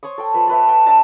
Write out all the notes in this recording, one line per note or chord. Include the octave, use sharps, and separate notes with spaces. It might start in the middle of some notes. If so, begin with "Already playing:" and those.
C5 C#5 C#6 D#6
A4 G5
F3 B4
A4 B4 E5
G5 A5
D4 E5 A5 A#5